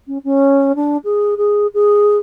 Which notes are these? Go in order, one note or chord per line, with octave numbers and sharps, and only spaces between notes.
C#4
C#4
D4
G#4
G#4
G#4